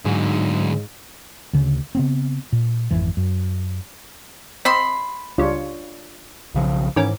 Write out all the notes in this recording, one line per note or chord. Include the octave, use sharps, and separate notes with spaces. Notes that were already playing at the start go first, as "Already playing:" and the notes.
G#2 D3 F#3
D2 C#3
C#3 B3 C4
A#2
G#1 F2 E3
F#2
C4 D#5 B5 C6 E6
C#2 G3 D4 F4 C#5
B1 C#3 F3
G#2 D#3 E3 C#4 D6